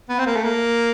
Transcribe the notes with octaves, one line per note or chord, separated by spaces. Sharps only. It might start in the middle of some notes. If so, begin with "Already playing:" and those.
B3
C4
A#3
A3
A#3